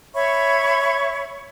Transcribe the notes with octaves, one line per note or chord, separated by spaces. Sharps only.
C#5 E5 B5 C#6